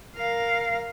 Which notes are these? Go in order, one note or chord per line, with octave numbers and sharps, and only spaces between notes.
A#4 F5